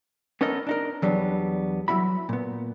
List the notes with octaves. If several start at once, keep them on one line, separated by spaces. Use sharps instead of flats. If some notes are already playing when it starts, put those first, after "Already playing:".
B3 C#4 D#4 A4 A#4 D#5
D4 D#4 A#4
E2 F#3 G3 B3 D4
F#3 E4 F#4 B5
A#2 B3